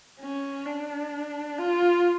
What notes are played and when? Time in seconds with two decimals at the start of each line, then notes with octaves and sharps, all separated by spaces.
0.20 C#4
0.66 D4
1.58 F4